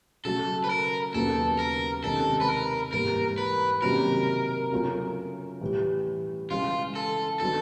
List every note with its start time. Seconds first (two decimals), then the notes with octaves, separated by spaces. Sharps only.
0.25 C#3 F#3 A3 A4
0.64 B4
0.70 A#4
1.14 D#2 C#3 F#3 B3 A4
1.59 A#4
2.04 C3 D#3 G#3 C#4 A4
2.41 B4
2.48 A#4
2.93 G#2 E3 G3 A#3 A#4
3.38 B4
3.82 C3 D#3 F#3 A#3 C#4 A#4
4.72 C#3 F#3 A3 C#4 F4
5.61 A2 E3 G3
6.51 C#3 E3 G#3 F4
6.95 A4
7.40 D#3 F#3 B3 D4 A4